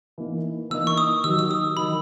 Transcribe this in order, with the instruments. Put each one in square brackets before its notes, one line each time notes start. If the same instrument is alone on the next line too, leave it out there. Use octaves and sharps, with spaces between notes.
[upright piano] E3 A#3 D#4
[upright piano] E3 A#3 D#4 [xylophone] E6
[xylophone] C#6
D#6
[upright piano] D#2 D#3 F#3 [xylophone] E6
[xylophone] E6
D#6
[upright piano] D#3 F#3 [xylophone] B5